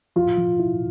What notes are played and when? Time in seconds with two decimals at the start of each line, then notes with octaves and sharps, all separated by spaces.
0.16 F3 F4
0.38 F3
0.60 E4